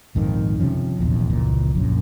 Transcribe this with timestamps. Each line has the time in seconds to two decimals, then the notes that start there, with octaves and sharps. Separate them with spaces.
0.15 A#1 F2 G#2 D#3
0.60 C3 D#3 F3 C#4
0.99 D#1 A#1 E2
1.30 F1 C#2 A#2 E3
1.75 A#1 F#2